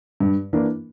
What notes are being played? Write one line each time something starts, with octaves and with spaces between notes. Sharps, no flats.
G2
E3 A#3 D4